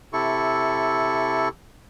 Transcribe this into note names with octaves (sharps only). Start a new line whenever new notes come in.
C3 E4 A4 C#6